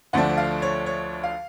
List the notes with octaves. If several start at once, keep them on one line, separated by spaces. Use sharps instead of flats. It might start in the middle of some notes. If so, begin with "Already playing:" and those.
D2 D3 F3 A3 D4 F#5
F5
C#5
C#5
F5